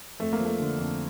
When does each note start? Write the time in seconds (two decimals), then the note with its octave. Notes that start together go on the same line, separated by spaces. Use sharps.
0.20 F2 A3
0.33 A#3
0.40 F3
0.45 A3
0.59 D3
0.79 F2